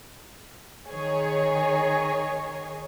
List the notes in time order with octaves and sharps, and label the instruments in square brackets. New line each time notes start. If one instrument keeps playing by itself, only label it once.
[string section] D#3 G#4 C#5